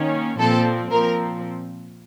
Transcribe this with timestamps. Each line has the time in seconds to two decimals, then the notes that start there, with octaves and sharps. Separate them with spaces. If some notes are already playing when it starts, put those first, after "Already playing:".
Already playing: D#3 A#3 C#4
0.38 A#2 F3 C4 A4
0.91 A#2 F3 C4 A#4